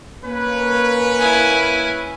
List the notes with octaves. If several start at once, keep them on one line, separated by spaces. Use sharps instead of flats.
A#3 C#4 B4
E4 G#5